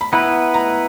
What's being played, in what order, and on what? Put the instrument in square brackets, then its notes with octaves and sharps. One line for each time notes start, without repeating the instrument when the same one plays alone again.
[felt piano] B5
[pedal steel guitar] B3 E4 B4 [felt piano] A#5
[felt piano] A#5